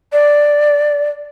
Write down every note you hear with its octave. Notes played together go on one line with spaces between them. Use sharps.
D5